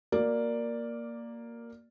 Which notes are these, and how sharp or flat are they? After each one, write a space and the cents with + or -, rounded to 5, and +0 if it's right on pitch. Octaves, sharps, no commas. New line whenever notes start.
A#3 +0 F#4 +0 D5 +0